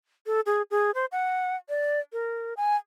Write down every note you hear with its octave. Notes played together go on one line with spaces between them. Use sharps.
A4
G#4
G#4
C5
F#5
D5
A#4
G#5